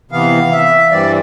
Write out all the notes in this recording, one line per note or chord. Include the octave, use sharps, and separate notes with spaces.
C3 E3 B3 F5
E5
G2 E3 G3 C4 D5